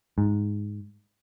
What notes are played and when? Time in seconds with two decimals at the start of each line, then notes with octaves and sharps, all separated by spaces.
0.18 G#2